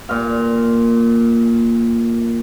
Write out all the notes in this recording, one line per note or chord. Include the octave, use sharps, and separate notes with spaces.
A#2 F5